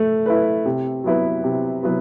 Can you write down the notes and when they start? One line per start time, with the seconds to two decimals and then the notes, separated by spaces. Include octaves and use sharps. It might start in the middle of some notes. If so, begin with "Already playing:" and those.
Already playing: A3
0.26 E4 B4
0.65 C3
1.04 F#3 B3 E4 B4
1.44 C3
1.83 F#3 B3 E4 B4